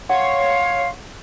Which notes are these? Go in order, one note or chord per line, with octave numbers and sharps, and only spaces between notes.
C#5 F5 F#5 C6